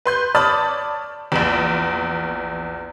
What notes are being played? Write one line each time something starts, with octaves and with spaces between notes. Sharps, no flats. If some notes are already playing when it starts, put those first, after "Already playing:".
B4 C6 G6
C#5 D5 A5 B5 D#6 F6
A#1 E2